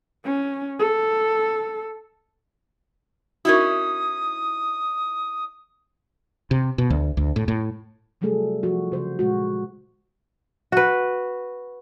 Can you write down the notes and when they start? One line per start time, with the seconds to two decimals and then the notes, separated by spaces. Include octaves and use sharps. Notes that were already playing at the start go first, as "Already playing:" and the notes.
0.25 C#4
0.79 A4
3.45 C#4 D#4 E4 F#4 A#4 D#6
6.51 C3
6.78 B2
6.90 D2
7.17 D2
7.36 A2
7.48 A2
8.21 C3 F#3 G3 A3 G#4 A4
8.63 F3 F#4
8.92 C#3 C5
9.19 A#2 G#3 F#4
10.72 F#4 B4